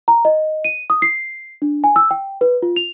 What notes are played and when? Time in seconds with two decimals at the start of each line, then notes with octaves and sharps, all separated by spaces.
0.08 A#5
0.25 D#5
0.65 D#7
0.90 D#6
1.02 C7
1.62 D4
1.84 G#5
1.96 E6
2.11 G5
2.41 B4
2.62 F4
2.76 F7